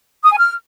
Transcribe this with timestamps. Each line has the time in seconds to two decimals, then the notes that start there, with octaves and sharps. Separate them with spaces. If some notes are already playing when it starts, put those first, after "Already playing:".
0.23 D#6
0.31 G#5
0.38 F6